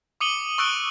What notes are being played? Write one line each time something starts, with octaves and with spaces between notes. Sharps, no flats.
D6 D#6 C#7 D#7 F#7 G7
C#6 E6 F#6 D7 G7